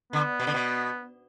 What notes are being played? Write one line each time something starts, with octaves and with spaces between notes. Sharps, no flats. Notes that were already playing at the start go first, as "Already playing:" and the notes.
D3 B3
B2
D3
B2